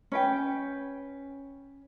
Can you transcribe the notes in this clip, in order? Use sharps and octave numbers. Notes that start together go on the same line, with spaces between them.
C#4 B4 G5